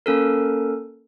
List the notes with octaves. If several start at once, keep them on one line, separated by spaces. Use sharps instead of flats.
A#3 C#4 A4 A#4